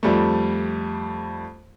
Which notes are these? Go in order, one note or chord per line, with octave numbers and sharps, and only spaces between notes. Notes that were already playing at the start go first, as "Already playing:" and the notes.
F2 G3 A3